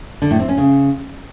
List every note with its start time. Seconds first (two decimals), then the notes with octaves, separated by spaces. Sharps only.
0.22 D3
0.31 A2
0.40 C4
0.49 C#4
0.58 C#3